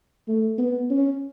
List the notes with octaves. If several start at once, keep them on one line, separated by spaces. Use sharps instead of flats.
A3
B3
C#4